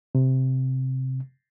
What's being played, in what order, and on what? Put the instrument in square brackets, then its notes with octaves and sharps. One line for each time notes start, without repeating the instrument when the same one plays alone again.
[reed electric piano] C3